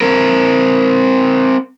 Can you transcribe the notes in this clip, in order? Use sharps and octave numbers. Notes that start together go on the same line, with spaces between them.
C4 A#4